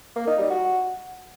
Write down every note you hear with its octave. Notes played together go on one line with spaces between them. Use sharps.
A#3
D#4
G3
F#4